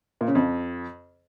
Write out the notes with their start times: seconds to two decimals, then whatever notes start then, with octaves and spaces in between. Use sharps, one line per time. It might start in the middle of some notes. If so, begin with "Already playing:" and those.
0.21 A#2
0.28 C#3
0.35 F2